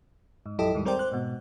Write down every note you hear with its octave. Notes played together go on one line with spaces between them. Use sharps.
G#2
A#1 F#2 E4 G4 A4 D#5
D#2 G#2 G3
G3 C4 A#4 C5 D5 G5
C5 F#6
G#2 B2